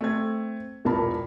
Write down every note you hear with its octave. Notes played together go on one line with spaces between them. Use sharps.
A3 C4 G#6
E1 A#1 G2 A#4 A5 B5